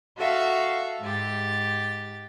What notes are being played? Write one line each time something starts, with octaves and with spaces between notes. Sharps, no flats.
F#4 A4 E5 F5
G#2 G4 A6